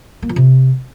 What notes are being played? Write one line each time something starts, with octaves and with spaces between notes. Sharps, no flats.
A#3
F3
C3